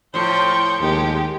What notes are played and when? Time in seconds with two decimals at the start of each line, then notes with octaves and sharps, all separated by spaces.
0.14 A2 F3 G5 C6 C#6 G6
0.80 D#2 G#3 D#4 G4